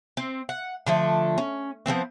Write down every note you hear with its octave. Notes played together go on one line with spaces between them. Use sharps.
C4
F#5
D3 F3 A3
C#4
F3 G#3 B3 C4